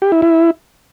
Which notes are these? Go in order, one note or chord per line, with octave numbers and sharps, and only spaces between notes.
G4
E4
E4